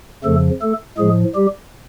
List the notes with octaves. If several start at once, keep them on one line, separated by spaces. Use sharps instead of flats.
F2 C#3 F3 A3 A4
A3 A4
A2 F3 G#3 G#4
G3 G4